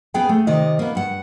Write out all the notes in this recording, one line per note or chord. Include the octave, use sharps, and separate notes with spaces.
B3 G#4 G5 G#5
A3
C3 D#3 D5 D#5
A#3 B3
G2 F#5